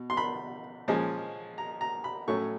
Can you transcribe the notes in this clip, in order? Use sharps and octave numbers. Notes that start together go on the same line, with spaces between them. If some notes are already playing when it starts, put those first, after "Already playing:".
Already playing: B2
C6
B5
A#2 F3 G#3 C#4
A#5
A#5
B5
A2 F#3 A3 C#4 C#6